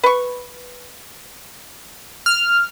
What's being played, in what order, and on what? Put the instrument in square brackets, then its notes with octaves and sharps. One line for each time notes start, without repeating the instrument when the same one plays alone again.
[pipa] B4 C#6
[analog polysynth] F6